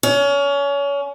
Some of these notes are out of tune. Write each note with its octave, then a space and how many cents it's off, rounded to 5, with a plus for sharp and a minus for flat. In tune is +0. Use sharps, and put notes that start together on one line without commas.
C#4 +30